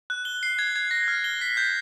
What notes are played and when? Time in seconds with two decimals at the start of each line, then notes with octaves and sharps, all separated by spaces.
0.10 F#6
0.25 G7
0.43 C7
0.59 G#6
0.76 G#6
0.91 A#6
1.08 F6
1.24 G7
1.41 B6
1.57 G6